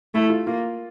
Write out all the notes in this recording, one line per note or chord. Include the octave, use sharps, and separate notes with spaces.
A3 E4
F4
A#3 F4